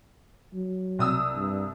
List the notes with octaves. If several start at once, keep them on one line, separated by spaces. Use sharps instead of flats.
F#3
C2 D#6 E6
G2